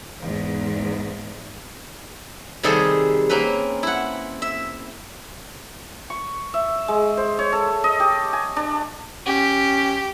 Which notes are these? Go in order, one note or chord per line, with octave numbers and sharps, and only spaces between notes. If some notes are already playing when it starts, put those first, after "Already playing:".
E2 G#2
C3 D#3 G3 G#4 A4 C5
A#3 C4 C#4 B4
E4 F#5
E5
C#6
E5
G#3
C5
C#5
A4
D#5
G4
G#5
D4
C#4 G4